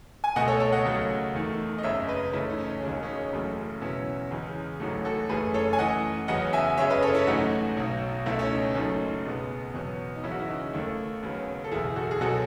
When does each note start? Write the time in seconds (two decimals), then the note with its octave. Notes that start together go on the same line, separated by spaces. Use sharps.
0.24 G#5
0.36 C#2 B2 A3 D#5 F#5
0.48 A4 C#5
0.60 A4 C#5
0.72 D#5 F#5
0.85 D#2 C#3 F#3 A3
1.34 E2 D#3 A3
1.78 D#5
1.83 G#1 F#2 C#3 C#5 E5
2.08 B4 D#5
2.33 C#2 C#3 E3 A3 C#4 E4
2.49 D#4
2.59 C#4
2.66 D#4
2.83 E1 D#2 C#3 G#3 C#4
3.03 C#4
3.07 D#4
3.32 F#1 E2 C#3 F#3 A3
3.81 E2 B2 F#3 B3 C#4 E4
4.31 E2 C#3 E3 G#3
4.80 A1 G#2 F#3 A3
5.05 F#4 A4
5.29 F#1 F#2 E3 A3 G#4 B4
5.54 A4 C#5
5.73 G#5
5.79 F#2 E3 A3 D#5 F#5
6.28 E2 C#3 F#3 B3 D#5 F#5
6.53 E5 G#5
6.77 F#2 C#3 G#3 C#5 E5
6.90 B4 D#5
7.02 A4 C#5
7.14 C#4 E4
7.27 A1 G#2 F#3 A3 D#4 F#4
7.77 B1 B2 F#3
8.26 C#2 B2 A3 C#4 E4
8.39 C#4
8.51 D#4
8.70 C#4
8.75 F#1 F#2 D#3 F#3 A3 D#4
9.25 C#2 B2 G#3 B3
9.74 E2 B2 F#3 B3
10.15 D#4
10.23 E1 E2 C#3 F#3 B3 C#4 E4
10.31 F#4
10.39 E4
10.48 D#4
10.73 D#2 D#3 A3
11.22 D#2 C#3 F#3 B3
11.64 A4
11.71 F#1 E2 B2 E4 G#4
11.96 F#4 A4
12.11 G#4
12.21 C#2 B2 F#3 F#4 A4